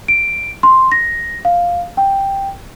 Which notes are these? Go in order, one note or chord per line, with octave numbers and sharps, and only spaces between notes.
D7
C6
A#6
F5
G5